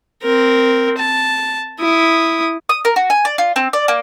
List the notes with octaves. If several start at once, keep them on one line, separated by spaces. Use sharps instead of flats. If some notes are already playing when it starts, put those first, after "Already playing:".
C4 A#4
A5
E4 D#6
D#6
A#4
F#4
G#5
D5
F4
C4
D5
A#3